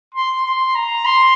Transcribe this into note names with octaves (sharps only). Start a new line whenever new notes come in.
C6
C6
A#5
C6